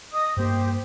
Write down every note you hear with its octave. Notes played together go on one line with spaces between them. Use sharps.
D#5 D#6
G2 A#3 G4 C5